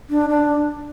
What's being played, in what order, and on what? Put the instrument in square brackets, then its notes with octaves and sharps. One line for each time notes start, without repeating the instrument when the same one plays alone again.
[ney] D4
D4